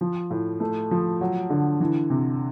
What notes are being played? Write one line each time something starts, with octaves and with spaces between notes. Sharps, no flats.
F3
A2
A3
F3
F#3
D3
E3
C3